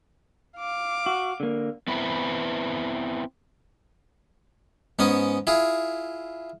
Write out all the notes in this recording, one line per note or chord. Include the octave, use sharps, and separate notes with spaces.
F5 D6
F#4
D3 A#3
B3 C4 E4 B4
G#2 B3 C#4 D#6
E4 F4 G#4